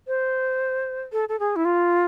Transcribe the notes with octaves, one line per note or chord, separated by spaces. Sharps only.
C5
A4
A4
G#4
E4
F4